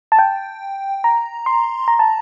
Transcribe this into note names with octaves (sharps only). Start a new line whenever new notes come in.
A5
G5
A#5
C6
A#5
A5